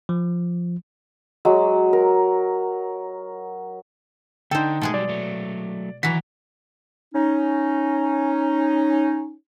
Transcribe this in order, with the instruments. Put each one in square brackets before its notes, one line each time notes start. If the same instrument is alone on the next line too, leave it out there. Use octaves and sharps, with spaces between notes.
[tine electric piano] F3
[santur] F#3 G#3
A#4
[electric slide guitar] D3 D4 [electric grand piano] D#4 G5 [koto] A4 C5
[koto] B2 G#3 G#4 [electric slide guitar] A3
[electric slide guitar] F#3 G3 [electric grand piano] D5
[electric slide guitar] F#3 A3
[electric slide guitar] D#3 F#3 A#5 [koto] E3 F#4 [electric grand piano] B6
[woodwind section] C#4 D#4